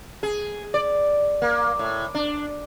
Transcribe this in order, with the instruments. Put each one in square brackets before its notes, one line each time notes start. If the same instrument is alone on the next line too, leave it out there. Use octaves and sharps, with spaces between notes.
[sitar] G#4
D5
A#3
A2
D4